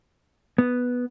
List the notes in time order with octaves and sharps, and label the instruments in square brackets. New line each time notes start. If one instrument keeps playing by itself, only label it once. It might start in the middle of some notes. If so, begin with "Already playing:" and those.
[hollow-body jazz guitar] B3